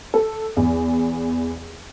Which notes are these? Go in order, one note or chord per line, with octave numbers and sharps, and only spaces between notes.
A4
E2